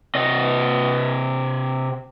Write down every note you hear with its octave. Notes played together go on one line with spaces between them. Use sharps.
C3 D#5